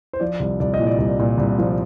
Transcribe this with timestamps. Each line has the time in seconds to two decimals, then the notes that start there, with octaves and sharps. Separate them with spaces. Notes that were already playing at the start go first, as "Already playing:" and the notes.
0.13 C5
0.20 F3 D5
0.40 C2
0.60 C2 D5
0.74 D#5
0.79 A#2
0.87 D5
0.98 C2
1.19 A#2
1.38 C2
1.58 F3